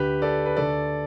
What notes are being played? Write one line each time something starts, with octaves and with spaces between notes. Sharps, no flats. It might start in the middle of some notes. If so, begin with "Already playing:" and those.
Already playing: D2 D3 G4 B4
A4 D5
B4
D2 D3 A4 D5